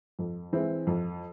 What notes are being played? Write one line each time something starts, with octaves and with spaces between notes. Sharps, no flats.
F2
E3 G#3 C4 E4
F2